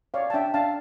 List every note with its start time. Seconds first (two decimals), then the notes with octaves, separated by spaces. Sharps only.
0.14 C#5 D5 F5
0.30 A5
0.34 D4 E5 G5
0.54 D4 F5 A5